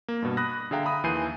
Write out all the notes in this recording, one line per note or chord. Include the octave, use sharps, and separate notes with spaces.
A#3
G2 B2
B5 D#6 F#6 A#6
D3 G#4 E5 F5 G5 A#5
A#5 B5 D#6
D#2 E3 G#5 G6 C7 D#7